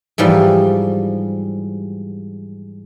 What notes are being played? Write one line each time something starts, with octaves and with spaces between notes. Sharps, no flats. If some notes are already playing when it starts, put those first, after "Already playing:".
G#2 E3 F3 G3